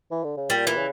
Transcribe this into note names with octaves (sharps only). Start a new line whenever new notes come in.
E3
D3
C#3
A#2 G3
E3
C#3